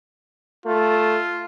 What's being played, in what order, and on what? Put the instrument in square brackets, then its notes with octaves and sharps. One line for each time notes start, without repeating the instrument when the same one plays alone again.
[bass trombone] A3 [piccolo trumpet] F4